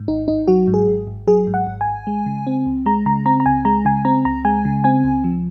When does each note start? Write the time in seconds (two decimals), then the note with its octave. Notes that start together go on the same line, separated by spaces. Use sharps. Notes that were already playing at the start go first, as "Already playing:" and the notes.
Already playing: G#2
0.08 G#1 D#4
0.28 G#1 D#4
0.48 F#3 F#4
0.68 G#2
0.74 G#4
0.87 G#1
1.07 G#1
1.27 F#3 G#4
1.47 G#2
1.54 F#5
1.67 G#1
1.81 G#5
1.87 G#1
2.07 G#3
2.26 C#3
2.47 C4
2.66 C#2
2.86 G#3 A#5
3.06 C#3 A#5
3.26 C4 A#5
3.40 A#5
3.46 C#2 G#5
3.65 G#3 A#5
3.85 C#3 G#5
4.05 C4 A#5
4.25 C#2 A#5
4.45 G#3 G#5
4.65 C#3
4.84 C4 G#5
5.04 C#2
5.24 F3